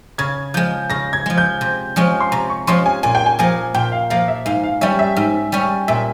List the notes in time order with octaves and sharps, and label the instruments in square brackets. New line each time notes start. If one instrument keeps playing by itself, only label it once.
[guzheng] C#3 [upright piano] G#6
[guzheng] F3 G#3 [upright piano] G6
[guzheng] C#3 [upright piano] A#6
[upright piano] G#6
[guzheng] F3 G#3
[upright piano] G6
[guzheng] C3
F3 G#3 C#4
[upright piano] C6
[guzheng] C3 [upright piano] A#5
[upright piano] C#6
[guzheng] F3 G#3 C#4 [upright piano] C6
[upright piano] G#5
[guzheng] A#2 [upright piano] G#5
[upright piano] G5
G#5
[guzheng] F3 A#3 [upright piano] G#5
[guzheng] A#2 [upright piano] G5
[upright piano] F5
[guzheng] F3 A#3 [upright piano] F5
[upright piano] E5
[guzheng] G#2 [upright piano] F5
[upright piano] F5
[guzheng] G3 C#4 [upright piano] E5
[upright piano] E5
[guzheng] G#2
G3 C#4
[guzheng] A#2 [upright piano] E5